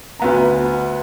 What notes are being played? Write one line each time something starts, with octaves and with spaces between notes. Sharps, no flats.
D2 B3 A#5